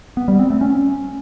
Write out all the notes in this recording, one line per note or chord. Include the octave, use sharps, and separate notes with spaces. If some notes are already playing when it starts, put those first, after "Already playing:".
B3
G3
C4
A3
C#4